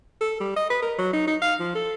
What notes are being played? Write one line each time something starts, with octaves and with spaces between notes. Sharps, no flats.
A4
G3
D#5
B4
A#4
F#3
D#4
D#4
F5
F3
A4